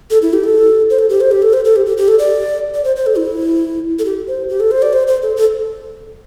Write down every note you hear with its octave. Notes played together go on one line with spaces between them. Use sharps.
A4
E4
G4
A4
C5
A4
G4
C5
G4
A4
C5
A4
G4
G4
G4
A4
D5
D5
C5
C5
A4
E4
A4
G4
C5
G4
A4
C5
D5
C5
C5
A4
A4